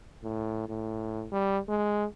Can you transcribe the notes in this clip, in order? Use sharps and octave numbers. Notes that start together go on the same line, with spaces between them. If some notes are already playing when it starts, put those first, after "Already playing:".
A2
A2
G3
G#3